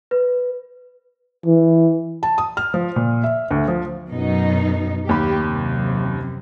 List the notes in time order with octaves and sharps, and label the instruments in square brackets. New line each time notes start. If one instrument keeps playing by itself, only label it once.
[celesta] B4
[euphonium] E3
[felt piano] A5
D#6
F6
F3
A#2
E5
D2
F3
[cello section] F#2 B2 D#4
[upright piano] D#2 B5 [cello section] G4
[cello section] F#2 C3